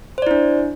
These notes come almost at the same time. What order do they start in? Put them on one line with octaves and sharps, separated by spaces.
C5 D5 E4 D4